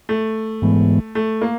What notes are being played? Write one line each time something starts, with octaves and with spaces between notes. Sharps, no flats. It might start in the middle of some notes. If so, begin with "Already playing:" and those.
A3
G#2 E3 G#3 B3
A3
A#3